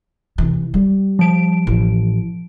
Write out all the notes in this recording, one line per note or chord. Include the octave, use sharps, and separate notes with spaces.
C3 E3
G3
F3 D7
A1